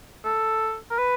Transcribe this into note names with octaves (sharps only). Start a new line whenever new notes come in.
A4
A#4
B4